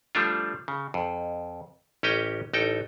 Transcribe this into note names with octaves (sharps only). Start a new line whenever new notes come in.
F3 G3 A3 D4 F4
C#3
F2
A1 C#4 G4 D#5 G5
A1 D#4 A4 G5